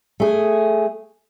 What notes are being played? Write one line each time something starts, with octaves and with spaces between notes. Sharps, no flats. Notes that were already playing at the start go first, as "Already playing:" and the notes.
A3 G#4